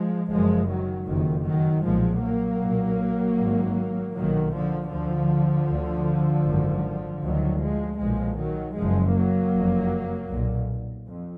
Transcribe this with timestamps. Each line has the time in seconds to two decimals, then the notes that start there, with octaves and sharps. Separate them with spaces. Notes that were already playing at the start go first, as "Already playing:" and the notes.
Already playing: F3 G#3
0.30 F#1 F#2 F3 G#3
0.69 D#3 F#3
1.07 F#1 F2 D#3
1.45 D#3 F#3
1.84 B1 A#2 F3 G#3
2.23 F#3 A#3
2.61 B1 A#2
3.38 G#1 G#2
4.15 B1 A#2 D#3 F#3
4.54 D3 F3
4.92 D2 D3 F3
5.69 D2
6.46 G#1 F#2
7.23 D2 D#3 F#3
7.62 F3 G#3
8.00 B1 A#2 F3 G#3
8.38 D#3 F#3
8.77 F#1 F#2 F3 G#3
9.15 F#3 A#3
9.55 F#1 F2
10.31 B1 A#2
11.07 F2